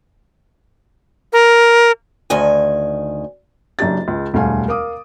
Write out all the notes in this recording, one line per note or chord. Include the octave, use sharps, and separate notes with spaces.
A#4
D2 D#3 G#5
F#1 F#2 D4 G4 A6
C#2 G#3
E1 D2 G3 A3 F5 G#5
A#4 F5 D6 D#6